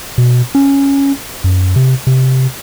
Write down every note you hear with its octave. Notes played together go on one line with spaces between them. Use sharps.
B2
C#4
F#2
C3
C3